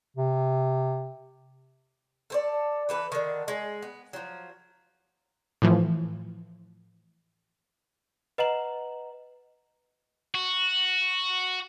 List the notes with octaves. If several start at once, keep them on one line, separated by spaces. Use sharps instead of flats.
C3
A4 C5 D5
E3 A4 B4
D3 D#3
G#3
B3
F3 F#3
A2 E3 F3
B4 D#5 F#5 A#5 E7 F#7
F#4